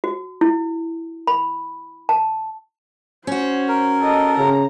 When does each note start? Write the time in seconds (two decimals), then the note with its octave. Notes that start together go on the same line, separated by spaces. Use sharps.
0.04 F#4
0.41 E4
1.27 B5
2.09 A5
3.27 C#4 F#4 C5
3.68 A#4
4.01 A4 D#5
4.38 C#3 A#5